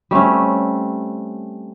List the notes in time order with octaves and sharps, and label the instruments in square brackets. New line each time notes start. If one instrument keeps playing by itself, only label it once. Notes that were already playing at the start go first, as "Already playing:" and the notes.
[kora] G3 A3 C4 C#4